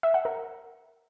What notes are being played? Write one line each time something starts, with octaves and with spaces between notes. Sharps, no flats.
E5
F#5
A#4